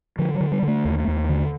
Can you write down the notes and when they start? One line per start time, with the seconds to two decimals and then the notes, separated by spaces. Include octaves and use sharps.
0.19 D3 F3
0.34 F#3
0.41 D3
0.52 G3
0.63 D3
0.68 A3
0.85 D#2
1.08 D#2
1.29 D3